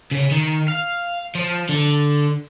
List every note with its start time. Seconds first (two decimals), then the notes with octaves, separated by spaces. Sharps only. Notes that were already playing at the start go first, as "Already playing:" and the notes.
0.11 C#3
0.31 D#3
0.68 F5
1.35 F3
1.69 D3